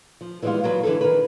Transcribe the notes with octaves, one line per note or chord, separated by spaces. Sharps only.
F3
E3 F3 G3 G#3 B3 F4
F3 F#3 F4 A#4 B4
D3 E3 G3 G#4 A4
D#3 A#4 B4